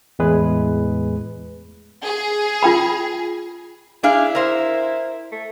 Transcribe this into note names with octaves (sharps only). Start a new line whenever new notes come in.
E2 A2 G#3 G#4 B4
G#4
F4 G5 B5
D4 E4 G#4 F5
A#4 C5
A3